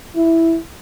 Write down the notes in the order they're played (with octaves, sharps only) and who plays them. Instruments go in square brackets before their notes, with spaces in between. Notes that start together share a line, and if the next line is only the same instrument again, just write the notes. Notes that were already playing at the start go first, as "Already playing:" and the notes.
[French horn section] E4